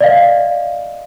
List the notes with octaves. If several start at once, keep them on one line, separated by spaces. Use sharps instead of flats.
D5 D#5 F5